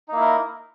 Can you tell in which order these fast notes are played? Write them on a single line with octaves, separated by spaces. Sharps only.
D#4 A#3 E4 A#4